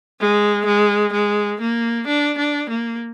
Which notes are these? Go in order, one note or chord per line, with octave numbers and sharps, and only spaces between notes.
G#3
G#3
G#3
A#3
D4
D4
A#3